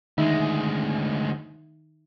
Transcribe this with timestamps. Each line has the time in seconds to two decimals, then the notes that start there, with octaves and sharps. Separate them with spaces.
0.18 D2 D#3 G#3 D#4 E5